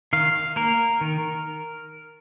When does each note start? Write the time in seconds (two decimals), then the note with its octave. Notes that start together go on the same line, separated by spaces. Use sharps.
0.13 D#3 F5
0.56 A#3 A#4
1.01 D#3